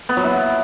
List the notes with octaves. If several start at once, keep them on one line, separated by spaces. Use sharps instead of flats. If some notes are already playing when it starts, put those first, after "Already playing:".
B3
F#3
E4